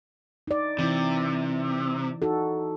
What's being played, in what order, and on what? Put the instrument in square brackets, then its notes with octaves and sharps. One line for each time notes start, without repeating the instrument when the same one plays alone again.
[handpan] D#4 D5
[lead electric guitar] C3 [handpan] E3 E4
[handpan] D#4 F#4 A4